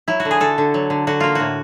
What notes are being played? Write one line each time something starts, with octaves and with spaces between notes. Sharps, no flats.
F#3 E4
F#4
D3
G#4
D3 A4
D3
F#3
D3
D3 F#4
A#3 F4
A2 F#4